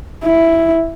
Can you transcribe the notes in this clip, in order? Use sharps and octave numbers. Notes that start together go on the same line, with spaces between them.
E4